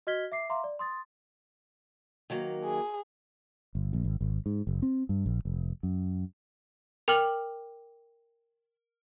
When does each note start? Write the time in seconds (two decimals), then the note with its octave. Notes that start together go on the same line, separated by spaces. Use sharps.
0.07 F#4 D#5 F6 G#6 B6 G7
0.32 E5 D6 C7
0.49 E5 F5 A#5 C6 D6
0.64 D5
0.79 C6 D#6 A6
2.30 D#3 F#3 A#3
2.65 G#4
3.75 G1
3.93 A#1
4.04 G#1
4.21 G#1
4.46 G#2
4.67 F#1
4.82 C4
5.09 G2
5.26 A#1
5.45 F1
5.83 F#2
7.08 A#4 G5 D6 F6 F#7